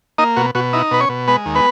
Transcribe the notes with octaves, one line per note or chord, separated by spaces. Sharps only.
A#3 D#4 D#5
B2 F#4
B2 F#4
D#4 E4
B2 B4
C#4 C#5
B2
G#3 B3 B4
D#2
B3 B4